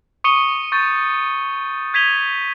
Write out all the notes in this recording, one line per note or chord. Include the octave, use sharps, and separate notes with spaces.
C#6 D#6 C#7 D#7 G7
C#6 G6 A6
G6 G#6 B6 D#7 F7 G7